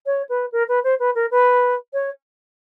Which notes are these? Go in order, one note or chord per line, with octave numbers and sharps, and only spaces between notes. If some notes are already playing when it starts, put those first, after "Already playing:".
C#5
B4
A#4
B4
C5
B4
A#4
B4
C#5